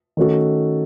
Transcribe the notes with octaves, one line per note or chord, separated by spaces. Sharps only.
D#3 A3 C#4 F#4 A4